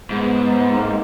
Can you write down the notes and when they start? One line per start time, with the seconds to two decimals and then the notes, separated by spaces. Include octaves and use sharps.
0.10 G#2 B3
0.69 A#3 C4 D#4